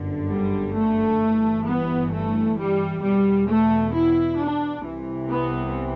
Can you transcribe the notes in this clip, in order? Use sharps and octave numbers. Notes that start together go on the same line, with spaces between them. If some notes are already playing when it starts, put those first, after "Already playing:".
Already playing: G1 F#2 D3
G3
A3
G1 G2 E3
B3
A3
G3
E2 B2 G3
A3
E4
D4
C2 C3 E3
B3